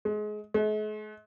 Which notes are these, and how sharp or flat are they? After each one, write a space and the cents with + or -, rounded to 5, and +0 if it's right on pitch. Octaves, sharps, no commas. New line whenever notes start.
G#3 +25
G#3 +45